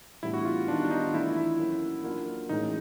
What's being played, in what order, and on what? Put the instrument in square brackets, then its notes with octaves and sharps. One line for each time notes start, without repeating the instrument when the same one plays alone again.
[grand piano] A2 E3 G3 B3 D4 [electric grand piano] E4
[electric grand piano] F#4
F4
[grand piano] D#3 G3 B3 D#4 [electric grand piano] D4
[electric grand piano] D#4
[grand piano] E3 A3 D4 F4 [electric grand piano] E4
[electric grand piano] E4
[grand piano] F#3 A#3 C#4 F#4
F#3 A#3 D4 F4
[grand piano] A2 E3 G#3 C#4 [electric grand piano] D#4